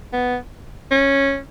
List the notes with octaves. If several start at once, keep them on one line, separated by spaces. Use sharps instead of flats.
B3
C#4